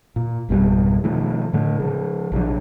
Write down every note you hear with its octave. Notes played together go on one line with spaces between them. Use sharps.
A#2
G#1 F2 B2 G3
B2 D#3 F3 A3
A2 D3 A3
C#3 F3
A#1 C3 F#3 D4